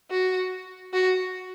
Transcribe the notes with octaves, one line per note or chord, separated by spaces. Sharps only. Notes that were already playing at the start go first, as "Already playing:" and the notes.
F#4
F#4